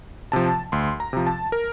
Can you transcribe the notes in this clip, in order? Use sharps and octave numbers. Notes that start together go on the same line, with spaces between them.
C3 F3 A5
D2 C6
A#5
C3 F3
A5
A#4